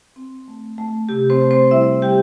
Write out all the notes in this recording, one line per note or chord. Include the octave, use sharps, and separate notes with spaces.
C4
A3
A3
C3 G4
C4 C5
A3
C4 C5
G3 E4 E5
G3 G4 G5